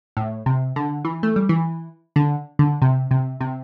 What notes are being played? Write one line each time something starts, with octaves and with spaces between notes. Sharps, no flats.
A2
C3
D3
E3
A3
G3
E3
D3
D3
C3
C3
C3